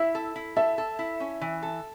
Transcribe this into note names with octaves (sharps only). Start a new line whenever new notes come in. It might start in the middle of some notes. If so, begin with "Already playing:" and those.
Already playing: E4 E5
A4
E4
A4 E5
A4
E4
C#4
E3
A4